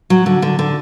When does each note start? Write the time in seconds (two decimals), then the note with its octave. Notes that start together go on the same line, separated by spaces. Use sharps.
0.10 F#3
0.26 D3
0.42 D3
0.59 D3